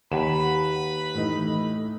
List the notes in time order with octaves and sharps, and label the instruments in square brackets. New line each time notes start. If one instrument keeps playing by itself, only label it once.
[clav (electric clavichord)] D#2 [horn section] B4 B5 [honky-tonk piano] F#5 E7
[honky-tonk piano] A2 E3 D#4